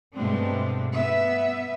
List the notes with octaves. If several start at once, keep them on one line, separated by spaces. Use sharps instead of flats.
G2 B2 G#3 A3 C4 D4
B3 E5